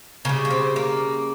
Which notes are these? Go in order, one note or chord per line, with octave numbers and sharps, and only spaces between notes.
C#3 G3 A#3
A#3
C4
A#3